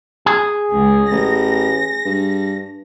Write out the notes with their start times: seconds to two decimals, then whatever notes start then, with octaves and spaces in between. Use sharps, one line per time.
0.26 G#4
0.72 C#2
1.11 A1 A#6
2.05 G2